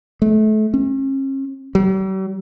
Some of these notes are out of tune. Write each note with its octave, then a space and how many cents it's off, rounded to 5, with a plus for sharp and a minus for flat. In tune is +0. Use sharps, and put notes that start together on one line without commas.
A3 -30
C#4 -45
G3 -45